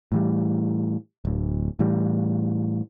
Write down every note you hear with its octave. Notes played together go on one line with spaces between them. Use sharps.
A2 E3 G3
D1 D2
A2 E3 G3